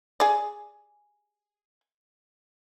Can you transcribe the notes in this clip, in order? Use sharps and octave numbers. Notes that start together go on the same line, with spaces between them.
G#4 D5